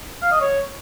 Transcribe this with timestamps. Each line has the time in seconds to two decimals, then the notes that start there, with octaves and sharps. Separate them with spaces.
0.22 F5
0.31 D#5
0.40 C#5